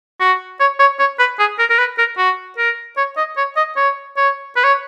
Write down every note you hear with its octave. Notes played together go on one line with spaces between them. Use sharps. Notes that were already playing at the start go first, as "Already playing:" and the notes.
F#4
C#5
C#5
C#5
B4
G#4
A#4
A#4
B4
A#4
F#4
A#4
C#5
D#5
C#5
D#5
C#5
C#5
B4
C#5